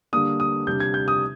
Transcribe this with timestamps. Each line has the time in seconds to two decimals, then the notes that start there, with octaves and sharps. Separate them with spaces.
0.13 D3 G3 A#3 D4 D#6
0.40 D#6
0.67 C3 G3 D4 G6
0.80 G#6
0.94 G6
1.08 D#6